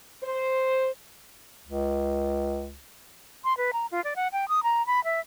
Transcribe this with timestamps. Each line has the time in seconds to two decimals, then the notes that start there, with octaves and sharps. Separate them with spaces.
0.24 C5
1.65 C#2
3.44 C6
3.57 B4
3.73 A#5
3.91 F4
4.04 D5
4.16 F#5
4.32 G5
4.48 D#6
4.63 A#5
4.87 B5
5.04 E5